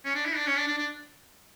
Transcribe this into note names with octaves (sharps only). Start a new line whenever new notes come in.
C#4
D4
E4
D4
C#4
D4
D4
D4